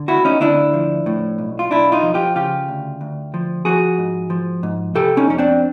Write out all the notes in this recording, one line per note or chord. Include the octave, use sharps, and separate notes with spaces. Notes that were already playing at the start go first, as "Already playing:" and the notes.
Already playing: D3
D2 E4 F#4
C#4 D#4
D2 D4 E4
F3
A2
B1
F4
B1 D4 E4
D#4 F4
F3
F4 G4
C#3 F4 G4
D2
D2
F3
F3 F#4 G#4
G#2
F3
G#2
C3 G4 A4
C#4 D#4
F2 C#4
C4 D4